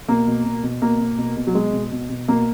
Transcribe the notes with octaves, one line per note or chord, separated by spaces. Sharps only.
B2 A#3
B2
B2
B2
B2 A#3
B2
B2
B2
F#3
B2 G#3
B2
B2
B2
B2 A#3